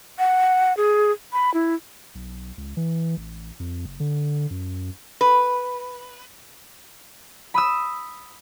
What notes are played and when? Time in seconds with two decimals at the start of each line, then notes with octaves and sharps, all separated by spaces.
0.19 F#5
0.77 G#4
1.33 B5
1.54 E4
2.15 B1
2.58 C#2
2.77 E3
3.17 A1
3.60 F2
3.86 F#1
4.00 D3
4.50 F#2
5.21 B4
7.54 B5 D#6 E6